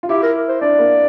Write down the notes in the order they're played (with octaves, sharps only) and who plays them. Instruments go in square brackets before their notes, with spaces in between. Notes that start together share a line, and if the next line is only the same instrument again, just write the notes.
[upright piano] F4
[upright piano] E4 [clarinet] G4
[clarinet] A#4
C5
[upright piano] D4 [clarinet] D5
[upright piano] A#3